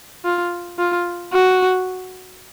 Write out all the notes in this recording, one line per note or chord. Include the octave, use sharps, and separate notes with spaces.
F4
F4
F#4